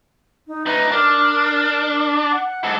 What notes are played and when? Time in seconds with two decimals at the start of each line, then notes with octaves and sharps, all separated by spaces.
0.47 D#4
0.66 D2 D#4 B4
0.92 D4 A#4
2.32 F#5
2.64 G#2 A4